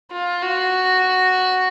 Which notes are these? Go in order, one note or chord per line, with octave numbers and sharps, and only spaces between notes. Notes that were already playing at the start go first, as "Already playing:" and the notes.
F4
F#4